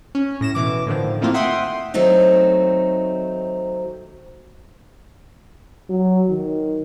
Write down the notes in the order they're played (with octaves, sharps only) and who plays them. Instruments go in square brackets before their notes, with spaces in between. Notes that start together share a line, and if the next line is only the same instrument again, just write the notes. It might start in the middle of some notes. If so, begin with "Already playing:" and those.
[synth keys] C#4
A2 A#6 E7
B2 E3 D6
A2 D3 D#3 F3
D#3 A3 A#3 C4 E4 F4
E5 F#5 G5 C6 D#6
[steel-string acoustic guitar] D#3 F#3 A3 C4 D#4
[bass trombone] F#3
D#3